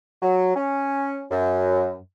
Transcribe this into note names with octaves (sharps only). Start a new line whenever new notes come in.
F#3
C#4
F#2